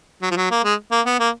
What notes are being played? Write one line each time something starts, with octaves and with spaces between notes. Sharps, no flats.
F#3
F3
F#3
A#3
G#3
A#3
B3
A#3